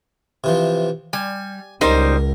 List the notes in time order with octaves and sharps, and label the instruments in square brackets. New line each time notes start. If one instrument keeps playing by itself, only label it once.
[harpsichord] C3 E3 F3
[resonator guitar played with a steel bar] G3 [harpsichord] G#5
[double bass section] C#2 [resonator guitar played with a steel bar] G3 D#4 C5 [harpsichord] A#4 A#5